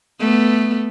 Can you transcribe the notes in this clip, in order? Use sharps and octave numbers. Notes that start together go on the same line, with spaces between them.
A3 B3